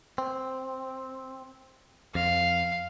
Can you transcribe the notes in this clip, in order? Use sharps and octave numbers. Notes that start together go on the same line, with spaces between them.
C4
F2 F5